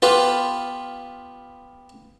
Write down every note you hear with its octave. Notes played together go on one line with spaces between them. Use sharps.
B3 F4 G4 B4